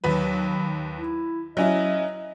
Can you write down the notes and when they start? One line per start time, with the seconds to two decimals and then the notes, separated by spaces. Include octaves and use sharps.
0.04 D#2 F#3 B4
0.96 E4
1.57 F#3 C#4 E4 D#5